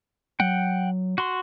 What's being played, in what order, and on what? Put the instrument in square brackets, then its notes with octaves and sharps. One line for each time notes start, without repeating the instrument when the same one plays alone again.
[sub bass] F#3 [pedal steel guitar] F#5 G5
[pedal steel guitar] F#4 C6